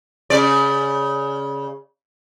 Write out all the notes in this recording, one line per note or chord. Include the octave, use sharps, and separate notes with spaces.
C#3 D5